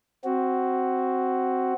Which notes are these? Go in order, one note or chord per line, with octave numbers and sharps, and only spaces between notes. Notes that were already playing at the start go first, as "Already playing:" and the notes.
C4 F#4